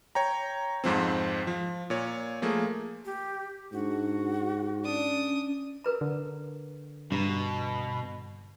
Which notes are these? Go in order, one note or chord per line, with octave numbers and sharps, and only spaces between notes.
C#5 G5 A#5
F2 G#2 F3 C4
F3
A#2 C#5
F3 A3 A#3 G#4
G4
G#2 D4 F#4
C#4 D4 D#6
A#4 B4 A#5
D3
G2 B2 A#5